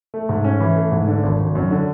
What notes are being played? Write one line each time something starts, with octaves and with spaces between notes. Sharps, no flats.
A3
G#2
C#4
E3
A3
G#2
D3
G#1
G#1
F#2
D3